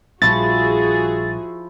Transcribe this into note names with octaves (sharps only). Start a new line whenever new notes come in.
A#1 F3 G3 E4 F#4 G#4 C#6 A6